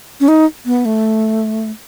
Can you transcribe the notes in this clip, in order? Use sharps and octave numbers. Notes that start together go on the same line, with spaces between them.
C#4
D#4
B3
A3